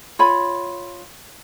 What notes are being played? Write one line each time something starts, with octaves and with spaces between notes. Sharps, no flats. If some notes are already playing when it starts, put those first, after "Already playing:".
F4 C#5 B5